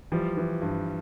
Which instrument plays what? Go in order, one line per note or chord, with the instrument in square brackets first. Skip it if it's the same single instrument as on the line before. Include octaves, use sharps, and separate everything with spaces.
[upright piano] E3 [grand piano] F3 G3
[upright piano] E3
G2